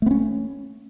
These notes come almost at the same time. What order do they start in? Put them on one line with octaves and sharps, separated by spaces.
A3 B3 C#4